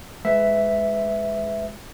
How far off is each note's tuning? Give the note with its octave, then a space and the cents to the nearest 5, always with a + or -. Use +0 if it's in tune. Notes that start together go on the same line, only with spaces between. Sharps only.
G#3 +0 B4 +20 E5 +0